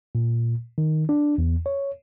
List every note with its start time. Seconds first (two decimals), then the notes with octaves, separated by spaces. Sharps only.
0.15 A#2
0.78 D#3
1.09 D4
1.38 E2
1.66 C#5